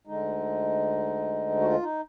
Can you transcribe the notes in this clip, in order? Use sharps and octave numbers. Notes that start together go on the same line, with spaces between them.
D2 D3 G#3 D#4
F#4
F4
D#4